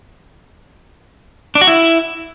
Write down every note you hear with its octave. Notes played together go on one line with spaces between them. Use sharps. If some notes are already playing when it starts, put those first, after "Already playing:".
D4
F#4
E4